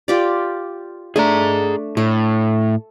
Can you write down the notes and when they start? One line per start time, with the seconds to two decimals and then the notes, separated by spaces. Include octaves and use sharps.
0.08 F4 G4 D5
1.16 A3 D4 G#4 A#5
1.97 A2 A4